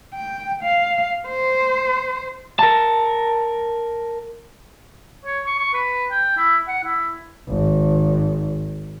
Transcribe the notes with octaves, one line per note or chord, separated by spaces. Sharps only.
G5
F5
C5
A#4 A5
C#5
C#6
C#6
B4
G5
E4
F#5
E4
G#1 D#3